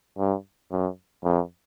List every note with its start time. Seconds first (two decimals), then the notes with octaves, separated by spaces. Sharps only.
0.18 G2
0.72 F#2
1.24 F2